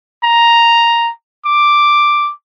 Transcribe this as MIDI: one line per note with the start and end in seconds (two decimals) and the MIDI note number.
0.24 1.11 82
1.46 2.31 86